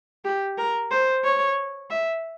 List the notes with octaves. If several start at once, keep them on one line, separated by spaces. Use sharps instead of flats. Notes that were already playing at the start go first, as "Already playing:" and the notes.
G4
A#4
C5
C#5
E5